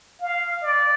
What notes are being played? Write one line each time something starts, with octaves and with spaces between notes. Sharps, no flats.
F5
D5